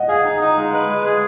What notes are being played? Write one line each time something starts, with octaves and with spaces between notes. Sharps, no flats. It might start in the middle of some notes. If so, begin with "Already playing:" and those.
Already playing: D#5 F#5
G#4 F5 G#5
D#4
D#4
G#3
B4
G#3
G#4